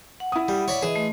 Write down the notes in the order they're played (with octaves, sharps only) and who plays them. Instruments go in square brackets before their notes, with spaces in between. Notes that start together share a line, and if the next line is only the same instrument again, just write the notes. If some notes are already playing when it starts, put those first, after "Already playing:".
[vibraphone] F#5
[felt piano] E4 D#6
[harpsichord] G3
C#5 D5 B5
[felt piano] E3 [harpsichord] G#4 [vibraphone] D#5 E5
[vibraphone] A3